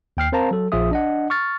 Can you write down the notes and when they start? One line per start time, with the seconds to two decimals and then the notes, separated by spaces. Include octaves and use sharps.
0.17 D#2 G5 F6 C7
0.32 C4 A#4 C5 F5 A5 A#5
0.51 F#3 A4
0.72 A#1 F3 F4 G#4 E5 D#6
0.91 D4 D#5 F#5
1.30 C#6 F6 A6